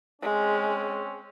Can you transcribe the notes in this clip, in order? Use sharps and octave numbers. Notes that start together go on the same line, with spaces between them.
G#3 C4 C#4